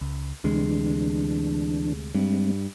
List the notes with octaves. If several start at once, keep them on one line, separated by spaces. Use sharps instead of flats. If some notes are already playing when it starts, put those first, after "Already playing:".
C#2
D2 C3 E3 G#3 D4
G2 G3 G#3 C4